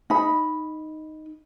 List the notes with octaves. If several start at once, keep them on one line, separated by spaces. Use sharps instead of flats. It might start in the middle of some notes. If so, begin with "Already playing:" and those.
D#4 B5